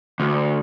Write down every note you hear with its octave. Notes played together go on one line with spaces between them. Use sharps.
D2